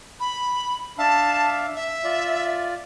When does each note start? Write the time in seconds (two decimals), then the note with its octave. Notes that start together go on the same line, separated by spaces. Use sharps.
0.20 B5
0.98 D4 E5 F5 A5
1.76 E5
2.04 F4 D5